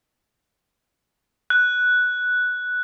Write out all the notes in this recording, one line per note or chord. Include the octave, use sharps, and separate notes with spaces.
F#6